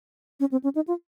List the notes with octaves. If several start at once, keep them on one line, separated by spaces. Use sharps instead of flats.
C#4
C4
C#4
D#4
F4